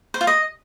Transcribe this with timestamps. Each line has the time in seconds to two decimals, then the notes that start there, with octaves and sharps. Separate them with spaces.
0.14 C5
0.21 F4
0.27 D#5